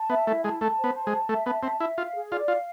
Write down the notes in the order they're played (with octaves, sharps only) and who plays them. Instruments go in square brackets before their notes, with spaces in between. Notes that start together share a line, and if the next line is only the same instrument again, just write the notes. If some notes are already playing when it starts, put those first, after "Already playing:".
Already playing: [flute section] A5
[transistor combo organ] B3 [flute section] E5
[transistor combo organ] A3 [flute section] E4
[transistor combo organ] G#3 [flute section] A5
[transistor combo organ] A3 [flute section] A5
[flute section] C5
[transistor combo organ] B3
[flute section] A5
[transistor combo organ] G#3
[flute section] A5
[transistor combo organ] A3 [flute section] E5
[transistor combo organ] B3 [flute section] A5
[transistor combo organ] C4 [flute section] E5
[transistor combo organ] E4 [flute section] E5
[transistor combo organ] F4 [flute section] F5
[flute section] G#4
[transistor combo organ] F4 [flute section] D5
[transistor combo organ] F4 [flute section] F5